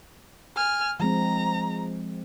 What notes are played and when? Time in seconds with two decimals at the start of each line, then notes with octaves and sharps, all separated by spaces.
0.56 G#5 F6
1.00 F3 G#3 C4 A#5